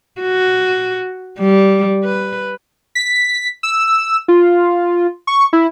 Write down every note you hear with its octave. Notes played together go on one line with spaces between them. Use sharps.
F#4
G3
B4
B6
E6
F4
C#6
E4